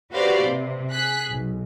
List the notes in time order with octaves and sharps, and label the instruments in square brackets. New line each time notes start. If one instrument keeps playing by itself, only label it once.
[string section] F#4 G4 B4 C5 D5 F5
C3
G#4 F#6 B6
B1